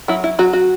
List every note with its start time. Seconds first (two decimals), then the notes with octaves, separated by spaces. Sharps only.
0.08 F#3 E4
0.24 E4
0.39 F#3 F#4
0.53 F#4